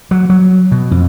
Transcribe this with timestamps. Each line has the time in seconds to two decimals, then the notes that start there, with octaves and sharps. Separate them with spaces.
0.11 F#3
0.30 F#3
0.72 B2
0.91 F2